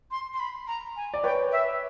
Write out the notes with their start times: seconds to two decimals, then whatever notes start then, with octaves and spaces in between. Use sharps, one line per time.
0.11 C6
0.34 C6
0.40 B5
0.67 A#5
0.96 G#5
1.14 D5
1.24 B4 C#5 G5
1.52 E5